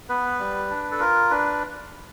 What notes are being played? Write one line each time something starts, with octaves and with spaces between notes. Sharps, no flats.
B3 B4
G3
D4
A4
F4 A#4
D4 B4